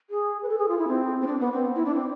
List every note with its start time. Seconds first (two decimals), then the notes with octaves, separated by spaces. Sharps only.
0.10 G#4
0.43 B4
0.49 A4
0.59 G#4
0.68 F4
0.78 E4
0.88 C4
1.22 C4
1.27 D4
1.40 B3
1.53 C4
1.76 E4
1.85 D4
1.95 C4